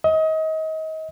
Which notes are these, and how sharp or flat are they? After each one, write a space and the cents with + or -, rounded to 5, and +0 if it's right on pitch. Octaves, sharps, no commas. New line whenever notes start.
D#5 +30